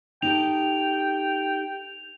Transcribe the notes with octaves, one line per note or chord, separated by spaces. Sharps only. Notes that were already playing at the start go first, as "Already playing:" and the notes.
D#4 G4 A4 G5 F7